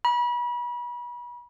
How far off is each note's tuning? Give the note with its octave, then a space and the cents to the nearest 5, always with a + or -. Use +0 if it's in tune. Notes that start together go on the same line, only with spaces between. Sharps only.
B5 -35